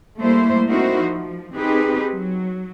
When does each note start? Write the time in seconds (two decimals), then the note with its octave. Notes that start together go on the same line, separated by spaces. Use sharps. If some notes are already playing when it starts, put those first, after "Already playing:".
0.19 G3 A3 A#3 E4 C5
0.69 C4 D#4 E4 F#4 A#4 C5
1.01 F3
1.54 C4 D#4 G4 G#4 B4
2.12 F#3